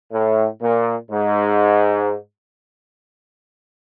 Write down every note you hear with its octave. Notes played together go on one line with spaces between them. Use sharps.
A2
A#2
G#2